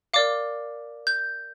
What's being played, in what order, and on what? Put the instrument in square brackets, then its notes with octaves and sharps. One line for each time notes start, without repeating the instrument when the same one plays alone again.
[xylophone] A#4 D5 F5 D6
G6